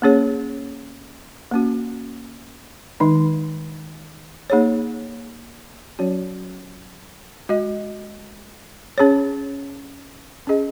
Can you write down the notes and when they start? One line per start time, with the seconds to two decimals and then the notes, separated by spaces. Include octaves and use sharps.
0.02 A#3 C#4 G#4 C#5
1.51 A#3 C#4 F#4
3.00 D#3 G#3 D#4
4.50 A#3 D#4 G#4 C#5
5.99 F#3 C#4 F#4 C#5
7.49 G#3 F#4 D#5
8.98 C#4 G#4 C#5
10.47 C#4 G#4 D#5